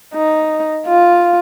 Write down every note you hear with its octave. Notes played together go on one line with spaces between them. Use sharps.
D#4
F4